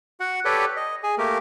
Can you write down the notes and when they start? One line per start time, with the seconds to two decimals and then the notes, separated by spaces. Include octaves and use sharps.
0.20 F#4 F#5
0.45 G4 A4 B4 C#5 D5 G5
0.76 D#5
1.03 G#4 G#5
1.18 A3 A#3 G4 A#4